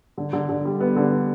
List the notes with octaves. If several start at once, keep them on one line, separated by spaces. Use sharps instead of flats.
D3
D3
D3
G3
B3
D3